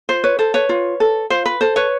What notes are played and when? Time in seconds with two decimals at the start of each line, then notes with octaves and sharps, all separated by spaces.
0.09 F4 C5
0.24 B4 C#5
0.39 A4 C5
0.54 B4 C#5
0.69 F4
1.00 A4
1.30 F4 C5
1.46 B4
1.61 A4 C5
1.76 B4 C#5